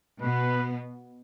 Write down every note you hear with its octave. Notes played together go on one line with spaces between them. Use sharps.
B2 B3 B4